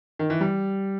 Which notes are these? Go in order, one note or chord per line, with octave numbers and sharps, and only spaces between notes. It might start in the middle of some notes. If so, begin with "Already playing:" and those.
D#3
E3
G3